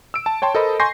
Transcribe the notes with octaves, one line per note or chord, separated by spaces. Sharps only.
E6 D7
A5
C#5 G5 A5 C6
A4 A#4 C5 D#5 A5 B5
G#5 C6 C#6 G6 A#6 C7